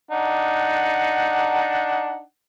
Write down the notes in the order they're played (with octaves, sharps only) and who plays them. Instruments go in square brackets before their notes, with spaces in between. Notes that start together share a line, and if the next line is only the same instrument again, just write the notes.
[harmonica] D4 D#4 F#5